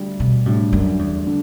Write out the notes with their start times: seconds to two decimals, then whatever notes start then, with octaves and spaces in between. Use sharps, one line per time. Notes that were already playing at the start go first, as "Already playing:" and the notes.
Already playing: D2 D3 G3 D4
0.20 B2
0.46 D2 A2 D3 G3 D4
0.73 F#2
0.99 E2
1.27 D3